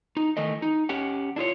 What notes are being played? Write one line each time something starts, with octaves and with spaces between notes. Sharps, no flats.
D#4
D#3 E3 A3 D#5
D#4
C#4 G4 F#5
D4 E4 F4 C#5